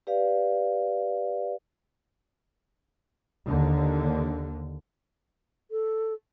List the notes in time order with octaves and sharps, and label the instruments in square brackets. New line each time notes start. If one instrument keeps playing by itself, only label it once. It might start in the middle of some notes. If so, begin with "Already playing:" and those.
[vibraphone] G4 B4 D5 F5
[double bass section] D#2 D3
[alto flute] A4